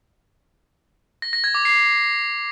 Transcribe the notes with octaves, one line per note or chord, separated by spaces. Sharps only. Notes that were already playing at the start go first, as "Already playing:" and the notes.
A#6
A#6
G#6
D6
C7